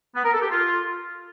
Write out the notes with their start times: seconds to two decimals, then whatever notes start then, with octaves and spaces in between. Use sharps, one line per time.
0.15 B3
0.24 A#4
0.33 A4
0.42 G4
0.51 F4